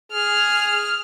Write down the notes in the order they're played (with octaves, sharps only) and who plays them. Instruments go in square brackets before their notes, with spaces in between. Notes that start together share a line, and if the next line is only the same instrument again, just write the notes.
[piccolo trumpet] G#4 [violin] F6